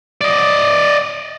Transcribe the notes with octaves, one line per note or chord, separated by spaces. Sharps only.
D5 D#5